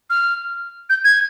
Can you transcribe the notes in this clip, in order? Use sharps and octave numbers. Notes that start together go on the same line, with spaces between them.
F6
G6
G#6